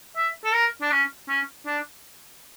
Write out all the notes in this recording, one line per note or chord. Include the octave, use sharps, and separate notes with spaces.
E5
A4
A#4
D4
C#4
C#4
D4